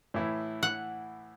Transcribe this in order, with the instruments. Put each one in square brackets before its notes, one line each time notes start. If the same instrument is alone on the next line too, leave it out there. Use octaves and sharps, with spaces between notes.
[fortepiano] A2 E3 E4
[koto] F#5